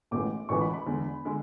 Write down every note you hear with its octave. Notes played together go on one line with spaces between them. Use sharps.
A1 A2 E3 G#3 D6
A1 A2 E3 G#3 C#6
B5
B5
E2 D3 G#3
D3 G#3